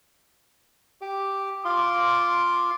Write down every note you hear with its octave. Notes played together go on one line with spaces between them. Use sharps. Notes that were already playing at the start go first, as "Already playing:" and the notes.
G4 D6
F4 F5 C6 D6